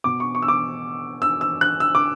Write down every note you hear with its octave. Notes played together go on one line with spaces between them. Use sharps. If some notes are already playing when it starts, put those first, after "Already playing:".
B2 D6
C#6
C#6
E6
D6
E6
E6
F#6
E6
D6